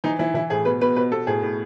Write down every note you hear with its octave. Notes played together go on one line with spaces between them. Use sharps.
E3 D#4
E3 E4
E3 E4
A2 G#4
B2 B4
B2 B4
B2 B4
B2 A4
A2 G#4
A2